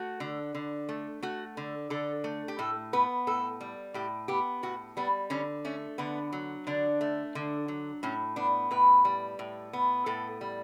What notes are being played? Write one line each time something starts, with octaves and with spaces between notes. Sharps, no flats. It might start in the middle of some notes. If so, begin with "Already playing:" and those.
Already playing: A3 F#4
D3
D3
A3
A3 F#4
D3
D3 A4
A3
G4
A2 A4
B3 B4
A2 A4
G3
A2 G4
B3 G4
A2 F#4
G3 B3
D3 C#4
A3 C#4
D3 B3
F#3
D3 D4
A3
D3
F#3
A2 C#4
B3 D4
A2 B4
G3
A2
B3
A2 A4
G3